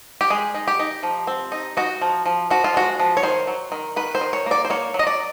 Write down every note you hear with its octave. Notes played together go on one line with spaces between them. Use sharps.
G4
G#3 G#4
D#4
G4
D#4
F3
C4
D#4
D#4 F#4
F3
F3
F3 F#4
F4
G#3 F#4
F3
C#5
D#3 C5
F#3
D#3
D#3 B4
C5
D#3
C#5
A#3 D5
C5
A#3 C#5
F#3
D#5
D5